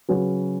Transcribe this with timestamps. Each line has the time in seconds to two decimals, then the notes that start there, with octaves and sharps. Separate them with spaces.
0.09 C#3 F#3 C#4 F#4 B4